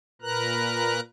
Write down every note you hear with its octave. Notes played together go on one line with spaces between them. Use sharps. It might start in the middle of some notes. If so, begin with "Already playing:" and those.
A#2 A#4 B4 A#5 F#6